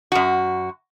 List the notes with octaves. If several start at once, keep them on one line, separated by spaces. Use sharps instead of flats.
F#2 F#4